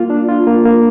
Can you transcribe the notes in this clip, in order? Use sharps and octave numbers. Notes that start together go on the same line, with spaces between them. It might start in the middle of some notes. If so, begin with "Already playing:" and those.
Already playing: A#3 F4
D4
F4
A#3
A#3